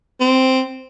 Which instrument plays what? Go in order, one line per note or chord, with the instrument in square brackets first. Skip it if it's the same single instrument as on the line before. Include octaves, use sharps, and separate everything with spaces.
[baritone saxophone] C4